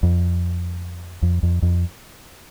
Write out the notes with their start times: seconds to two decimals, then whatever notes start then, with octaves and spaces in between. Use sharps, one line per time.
0.03 F2
1.23 F2
1.43 F2
1.62 F2